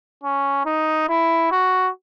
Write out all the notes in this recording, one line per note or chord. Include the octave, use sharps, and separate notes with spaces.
C#4
D#4
E4
F#4